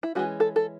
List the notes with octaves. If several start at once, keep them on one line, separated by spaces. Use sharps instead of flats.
E4
E3 G#3 C#4 F#4
A4
A4